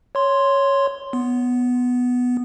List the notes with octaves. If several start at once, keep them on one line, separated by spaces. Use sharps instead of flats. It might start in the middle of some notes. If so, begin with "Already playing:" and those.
C#5 C6
B3